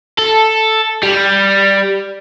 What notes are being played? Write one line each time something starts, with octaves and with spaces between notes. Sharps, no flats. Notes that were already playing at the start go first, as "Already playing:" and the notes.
A4
G3